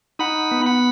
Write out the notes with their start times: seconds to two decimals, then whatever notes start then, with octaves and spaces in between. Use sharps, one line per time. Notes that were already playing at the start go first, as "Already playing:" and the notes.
0.19 D#4 F#5 B5
0.51 B3
0.66 F#5 B5